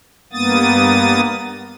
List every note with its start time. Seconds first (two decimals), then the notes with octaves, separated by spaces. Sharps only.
0.33 G2 A#3 B3 D#6 A6